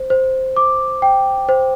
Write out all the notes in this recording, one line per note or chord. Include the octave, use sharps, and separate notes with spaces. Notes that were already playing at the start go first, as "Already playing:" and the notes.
Already playing: C5
C5
D6
G5
C5